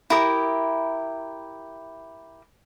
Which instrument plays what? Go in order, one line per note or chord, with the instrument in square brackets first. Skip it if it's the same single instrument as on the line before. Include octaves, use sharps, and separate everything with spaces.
[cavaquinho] E4 G4 A#4 D#6